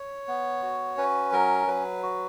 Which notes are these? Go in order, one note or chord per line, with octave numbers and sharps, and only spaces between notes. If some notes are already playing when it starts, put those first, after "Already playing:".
Already playing: C#5
B3
F#4
C#4 B4
F#3 A#4
F#3 B4
F#4